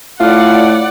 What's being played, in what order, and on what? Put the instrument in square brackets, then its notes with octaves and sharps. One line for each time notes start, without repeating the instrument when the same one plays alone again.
[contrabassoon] A2 [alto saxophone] F4 [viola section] D5 F#5